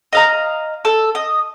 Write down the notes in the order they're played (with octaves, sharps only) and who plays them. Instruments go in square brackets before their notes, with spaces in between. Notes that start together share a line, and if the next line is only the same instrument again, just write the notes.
[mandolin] D#5 F5 A#5
A4
D#5